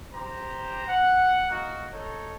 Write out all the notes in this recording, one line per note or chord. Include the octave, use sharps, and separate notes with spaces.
G4 C5 A#5
F#5
A#3 D#4 F#4
D#4 A4 C#5